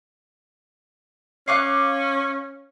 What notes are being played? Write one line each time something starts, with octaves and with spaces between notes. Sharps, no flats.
C#4 F5 D6 F#6